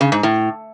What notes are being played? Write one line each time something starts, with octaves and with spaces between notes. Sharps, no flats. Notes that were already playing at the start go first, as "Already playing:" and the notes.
C#3
G#2
A2